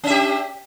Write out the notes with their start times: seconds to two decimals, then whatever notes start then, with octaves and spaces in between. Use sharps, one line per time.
0.04 C#4
0.07 E5
0.10 G4